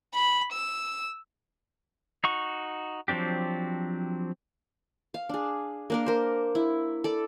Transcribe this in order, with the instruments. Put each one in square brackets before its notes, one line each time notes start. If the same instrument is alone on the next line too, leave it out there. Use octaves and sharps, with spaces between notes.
[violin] B5
E6
[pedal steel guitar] D#4 F#4 C#6
F3 F#3 C4 D4 G4
[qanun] F5
D4 G#4
A#3 D4 A#4
A#4 C5
E4
A4 D5